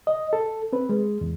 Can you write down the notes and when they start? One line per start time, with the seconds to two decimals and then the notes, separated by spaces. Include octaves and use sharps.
0.07 D#5
0.33 A4
0.73 C4 B4
0.89 G#3
1.21 E2